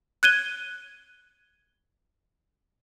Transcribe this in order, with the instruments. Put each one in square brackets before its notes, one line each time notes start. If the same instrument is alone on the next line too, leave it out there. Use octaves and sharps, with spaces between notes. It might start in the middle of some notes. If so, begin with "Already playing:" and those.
[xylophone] F#6 G#6 D#7 G7